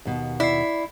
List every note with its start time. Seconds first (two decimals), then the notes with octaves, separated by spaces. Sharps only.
0.05 D#2 B2
0.40 E4 D5 C7